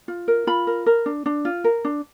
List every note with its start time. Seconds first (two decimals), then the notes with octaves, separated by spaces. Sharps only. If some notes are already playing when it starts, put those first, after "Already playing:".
0.08 F4
0.28 A#4
0.47 F4 B5
0.67 A#4
0.86 A#4
1.06 D4
1.26 D4
1.45 F4
1.64 A#4
1.85 D4